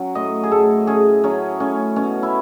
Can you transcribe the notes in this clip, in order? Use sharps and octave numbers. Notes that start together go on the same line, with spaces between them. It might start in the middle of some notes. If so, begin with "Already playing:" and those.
Already playing: F#3 C#4
A2 D#5
G#4
A2 A4
C#4 G#4
F#3 C#4
A2 C#4
B2 C#4
E4